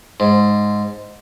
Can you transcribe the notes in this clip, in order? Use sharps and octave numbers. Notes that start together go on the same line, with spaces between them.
G#2